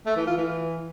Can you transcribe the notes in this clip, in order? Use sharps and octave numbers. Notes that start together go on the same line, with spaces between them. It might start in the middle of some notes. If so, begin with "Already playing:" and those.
A3
E3
F4
E3